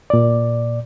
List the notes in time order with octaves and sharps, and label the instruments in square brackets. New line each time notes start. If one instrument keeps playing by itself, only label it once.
[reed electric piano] A#2 D5